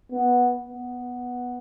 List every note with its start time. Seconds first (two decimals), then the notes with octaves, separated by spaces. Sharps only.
0.12 B3
0.65 B3